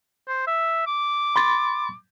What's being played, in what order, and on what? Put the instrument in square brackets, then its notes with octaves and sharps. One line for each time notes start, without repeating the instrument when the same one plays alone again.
[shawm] C5
E5
D6
[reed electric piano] B5 C6 A6